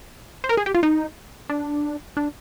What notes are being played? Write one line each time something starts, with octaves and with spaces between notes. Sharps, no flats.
C5
A#4
G#4
G4
F4
D#4
D4
D4